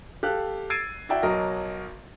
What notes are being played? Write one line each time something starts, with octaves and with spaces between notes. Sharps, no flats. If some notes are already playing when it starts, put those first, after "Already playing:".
G4 A4 F5 F#6
E6 G#6 A6 C7 D7 D#7
E4 F#4 D5 E5 G5
B1 F#3 A#4 D#5